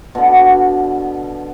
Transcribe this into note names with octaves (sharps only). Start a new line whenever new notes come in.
B2 D3